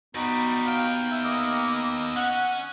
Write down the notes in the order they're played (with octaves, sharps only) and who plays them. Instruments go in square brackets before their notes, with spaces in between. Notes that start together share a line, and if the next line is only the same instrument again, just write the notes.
[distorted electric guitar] F#2 G3 [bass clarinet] B3 [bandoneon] D#4 F#4
[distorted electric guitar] D#2 G5 [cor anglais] F5
[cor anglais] E5
[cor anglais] A#3 [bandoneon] D#5 D#6 E6
[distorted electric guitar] C#4 [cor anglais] F#5